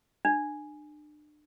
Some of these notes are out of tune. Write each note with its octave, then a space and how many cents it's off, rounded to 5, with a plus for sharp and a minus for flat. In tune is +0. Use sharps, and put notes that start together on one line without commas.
D4 +35